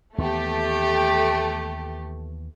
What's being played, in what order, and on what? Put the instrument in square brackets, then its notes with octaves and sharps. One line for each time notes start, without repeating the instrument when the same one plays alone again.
[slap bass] D#2 E3 B3 [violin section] A3 G4